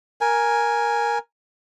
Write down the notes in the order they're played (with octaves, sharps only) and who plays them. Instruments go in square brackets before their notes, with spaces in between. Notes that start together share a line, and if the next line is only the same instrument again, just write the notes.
[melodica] A#4 G#5